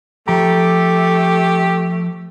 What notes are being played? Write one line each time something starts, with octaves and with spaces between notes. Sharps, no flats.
F3 A3 G4 A#5